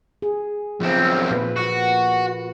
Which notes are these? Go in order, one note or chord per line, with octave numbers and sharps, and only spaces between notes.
G#4
B1 F3 C4
A#2 B4
F#4